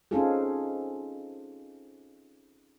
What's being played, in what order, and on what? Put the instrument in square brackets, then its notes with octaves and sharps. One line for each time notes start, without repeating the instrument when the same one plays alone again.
[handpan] C4 C#4 D#4 F4 G#4 A4